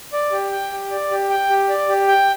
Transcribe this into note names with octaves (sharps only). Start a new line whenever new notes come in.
D5
G4
G5
G4
D5
G4
G5
G4
D5
G4
G5